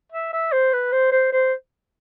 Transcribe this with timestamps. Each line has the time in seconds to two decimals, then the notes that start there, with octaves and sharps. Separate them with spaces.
0.13 E5
0.33 E5
0.53 C5
0.73 B4
0.93 C5
1.12 C5
1.33 C5